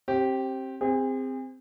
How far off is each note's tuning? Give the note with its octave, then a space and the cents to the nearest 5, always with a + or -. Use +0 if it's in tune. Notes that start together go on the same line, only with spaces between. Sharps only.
C4 +25 G4 -10
C4 -10 G#4 -40